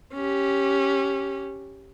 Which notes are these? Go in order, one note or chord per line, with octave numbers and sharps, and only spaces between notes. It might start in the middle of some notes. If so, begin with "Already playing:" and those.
C#4 G4